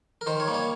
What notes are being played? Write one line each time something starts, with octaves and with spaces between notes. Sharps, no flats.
A#4
D#3 C5
C#5
G3 A#3
C#5